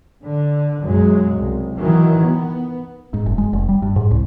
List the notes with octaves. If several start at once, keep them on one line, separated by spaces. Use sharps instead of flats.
D3
B1 F#2 F#3 G#3
C2
D#3 E3 F#3
B3
G#2
F#1
G#3
F1
G3
G2
G#2
C2